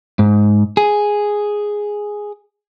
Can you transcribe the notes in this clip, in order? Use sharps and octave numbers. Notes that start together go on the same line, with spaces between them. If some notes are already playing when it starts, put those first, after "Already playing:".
G#2
G#4